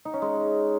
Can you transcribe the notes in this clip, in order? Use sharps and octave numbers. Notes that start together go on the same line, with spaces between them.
D#4
C#4
G#3